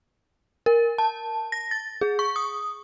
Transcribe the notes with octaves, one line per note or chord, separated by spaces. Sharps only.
A#4
A5
A#6
A6
G#4
C#6
D#6